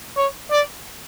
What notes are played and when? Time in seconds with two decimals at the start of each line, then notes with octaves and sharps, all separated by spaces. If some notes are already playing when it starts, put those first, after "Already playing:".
0.16 C#5
0.51 D5